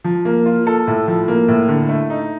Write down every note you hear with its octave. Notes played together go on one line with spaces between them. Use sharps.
F3
A#3
F4
A4
A2
F3
A#3
A2
D3
A3
D#4